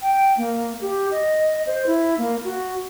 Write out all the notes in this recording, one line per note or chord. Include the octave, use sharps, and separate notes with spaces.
G5
A#3
G4
D#5
C5
E4
A#3
F#4